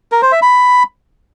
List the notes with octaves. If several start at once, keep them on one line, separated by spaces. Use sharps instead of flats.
A#4
C5
E5
B5